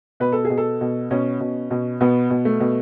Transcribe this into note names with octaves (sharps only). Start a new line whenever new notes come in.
B2 B4
A4
G#4
B2
A4
B2
B2 C#4
B2
B2
B2 B3
B2
A3
B2